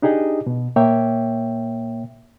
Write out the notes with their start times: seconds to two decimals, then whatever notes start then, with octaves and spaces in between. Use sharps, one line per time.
0.02 D4 D#4 G4 G#4 D#5
0.47 B2
0.76 A#2 A#3 C#5 E5 G5